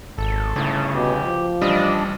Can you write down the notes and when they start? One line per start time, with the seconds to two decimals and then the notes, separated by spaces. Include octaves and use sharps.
0.18 G#1 A4
0.56 G1 A2 C#3
0.95 B2 G4
1.25 F3
1.62 A1 G3 D4 D#5